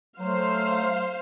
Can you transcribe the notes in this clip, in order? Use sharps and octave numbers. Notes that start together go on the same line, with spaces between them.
F#3 A3 C5 F5